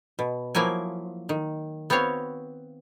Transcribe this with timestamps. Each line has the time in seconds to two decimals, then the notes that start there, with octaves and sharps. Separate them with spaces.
0.19 B2
0.55 F3 F#3 A#3 E4 G#5
1.29 D#3
1.90 B3 C4 F#4 C#5 F5